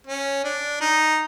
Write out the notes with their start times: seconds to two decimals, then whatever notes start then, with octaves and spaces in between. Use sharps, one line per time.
0.07 C#4
0.44 D4
0.81 D#4